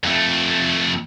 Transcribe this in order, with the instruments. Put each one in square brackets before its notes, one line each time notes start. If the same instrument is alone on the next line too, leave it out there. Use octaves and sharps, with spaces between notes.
[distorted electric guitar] F2 A3